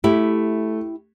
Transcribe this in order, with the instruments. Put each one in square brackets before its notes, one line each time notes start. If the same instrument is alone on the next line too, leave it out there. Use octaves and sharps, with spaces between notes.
[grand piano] A3 [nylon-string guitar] E4 G4